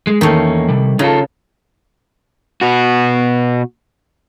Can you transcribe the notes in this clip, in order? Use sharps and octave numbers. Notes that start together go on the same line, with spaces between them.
G#3
E2 D#3 A3 A#3 C#4
C3 G3
C#3 D#4 F4 A4
B2 F#4